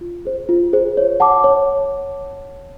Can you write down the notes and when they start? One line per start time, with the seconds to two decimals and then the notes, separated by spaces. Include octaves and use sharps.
0.01 F4
0.25 G#4 C5
0.49 F4
0.73 G#4 C5
0.97 C#5
1.20 F#5 A5 D6
1.44 C#5